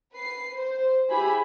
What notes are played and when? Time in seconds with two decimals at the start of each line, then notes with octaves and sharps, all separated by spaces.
0.13 B4 C7
0.54 C5
1.10 E4 G4 G#4 B4 B5